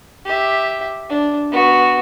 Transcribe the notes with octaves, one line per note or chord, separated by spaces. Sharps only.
G4 E5
D4
B3 F#4